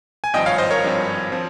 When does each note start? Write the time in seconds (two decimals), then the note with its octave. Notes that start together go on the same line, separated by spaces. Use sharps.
0.24 G#5
0.34 G#1 G2 F3 C4 D#5 G5
0.46 C#5 F5
0.58 C5 D#5
0.71 A#4 C#5
0.83 G#1 G2 F3 C4
1.32 F3 C4